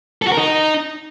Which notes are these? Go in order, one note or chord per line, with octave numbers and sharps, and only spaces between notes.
A4
F#4
A#4
D#4